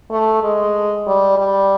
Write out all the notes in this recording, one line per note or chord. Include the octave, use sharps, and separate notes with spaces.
A3
G#3
G3
G3